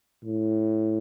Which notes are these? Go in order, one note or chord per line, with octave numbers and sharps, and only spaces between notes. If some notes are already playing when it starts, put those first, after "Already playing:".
A2